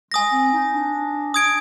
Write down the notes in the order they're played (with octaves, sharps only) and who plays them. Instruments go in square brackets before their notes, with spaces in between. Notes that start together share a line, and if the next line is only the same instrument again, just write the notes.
[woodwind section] G#3 [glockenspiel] G#5 D#6 A#6
[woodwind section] C4
D#4
D4
[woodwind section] D4 [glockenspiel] D#6 G#6 D7